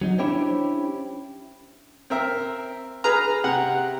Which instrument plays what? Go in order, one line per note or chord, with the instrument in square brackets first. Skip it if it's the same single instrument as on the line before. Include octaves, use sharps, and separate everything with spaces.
[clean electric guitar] F#3 C#4 D#4 F#4
C#4 D4 E4 G4 C5 C#5
[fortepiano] C4 A#4 E5
[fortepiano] G#4 B4 F6 [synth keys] A#5
[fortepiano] C3 [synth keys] F#5